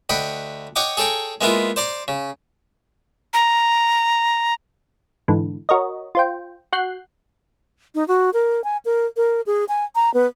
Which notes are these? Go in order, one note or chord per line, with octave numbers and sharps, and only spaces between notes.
D2 D#5 F#5 G5 B5
C#5 D#5 F#5 G5 D6
G#4 A4 C#5 G5 A#5
G#3 A#3 B3 E4 F4
C5 D5 A#5 C6
C#3
A#5
G#2 D3 E3
F#4 A#4 C#5 D#5
F4 C5 G5
F#4 F#5 F#6 G6 C7
D#4
F#4
A#4
G#5
A#4
A#4
G#4
G#5
A#5
B3